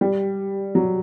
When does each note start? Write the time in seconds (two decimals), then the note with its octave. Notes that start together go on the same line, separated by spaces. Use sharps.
0.01 G3
0.75 F#3